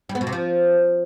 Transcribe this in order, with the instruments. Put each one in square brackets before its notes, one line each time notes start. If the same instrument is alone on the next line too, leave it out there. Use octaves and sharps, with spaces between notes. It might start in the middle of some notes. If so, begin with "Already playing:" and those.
[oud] G3
B3
B2
C3
F3